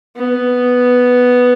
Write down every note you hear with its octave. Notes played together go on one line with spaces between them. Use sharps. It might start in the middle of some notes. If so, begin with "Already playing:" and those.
B3